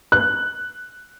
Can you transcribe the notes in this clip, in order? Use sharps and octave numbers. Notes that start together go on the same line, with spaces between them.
F#6